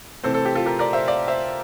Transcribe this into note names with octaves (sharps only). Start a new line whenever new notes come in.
C3 E3 A3 C4 A4 C5
A4 C5
G4
F4 A4
G4 A#4
A#4 D5
C5 E5
D5 F5
C5 E5